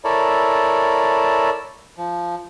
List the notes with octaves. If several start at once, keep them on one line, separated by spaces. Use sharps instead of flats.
E4 A4 A#4 C#5 D5
F3